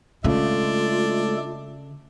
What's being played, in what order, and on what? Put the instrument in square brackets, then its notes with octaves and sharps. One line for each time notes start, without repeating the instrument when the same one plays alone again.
[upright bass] C#3 [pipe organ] G#3 A3 A4 [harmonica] D4 [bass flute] F4